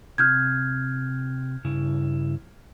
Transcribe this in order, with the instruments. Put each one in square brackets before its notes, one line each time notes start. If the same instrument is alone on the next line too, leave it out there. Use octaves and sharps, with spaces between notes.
[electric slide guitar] C3 [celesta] F6 G6 G#6
[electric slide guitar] G2 C#3 E4